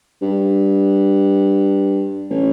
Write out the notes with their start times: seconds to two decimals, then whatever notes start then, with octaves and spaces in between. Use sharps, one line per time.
0.22 G2
2.30 A1